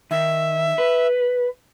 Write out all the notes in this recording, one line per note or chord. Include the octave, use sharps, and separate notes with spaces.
D#3 E5
B4